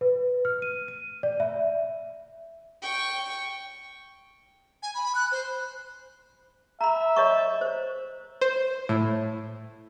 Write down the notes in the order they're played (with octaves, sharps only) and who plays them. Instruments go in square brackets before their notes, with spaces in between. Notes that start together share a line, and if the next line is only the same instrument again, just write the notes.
[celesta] B4
F6
D#7
D#7
D5
E5
[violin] G5 C#6
[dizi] G#5
B5
F#6
C5
[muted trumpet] E5 [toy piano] A#5 B5
[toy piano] C#5 D#5 C#6
C5
[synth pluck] C5
A2